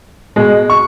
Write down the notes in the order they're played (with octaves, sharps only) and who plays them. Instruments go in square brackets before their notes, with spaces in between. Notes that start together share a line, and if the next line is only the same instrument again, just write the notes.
[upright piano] B2 G#3
C#6